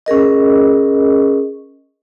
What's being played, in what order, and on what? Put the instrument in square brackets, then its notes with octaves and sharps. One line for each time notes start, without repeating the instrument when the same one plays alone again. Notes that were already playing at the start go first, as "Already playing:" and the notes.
[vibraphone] C#4 G#4 A#4 D#5